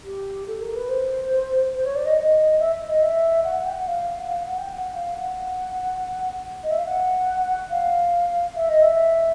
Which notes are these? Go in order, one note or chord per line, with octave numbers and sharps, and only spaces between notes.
G4
A4
A#4
B4
C5
C5
C#5
D5
D#5
D#5
E5
D#5
E5
F#5
F#5
G5
F#5
F5
F#5
F5
F#5
G5
F#5
F5
F#5
D#5
E5
F5
F#5
F5
E5
D#5
E5